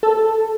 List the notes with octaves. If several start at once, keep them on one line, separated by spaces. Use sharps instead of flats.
A4